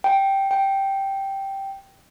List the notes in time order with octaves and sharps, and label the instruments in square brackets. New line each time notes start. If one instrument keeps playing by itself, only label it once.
[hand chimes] G5
G5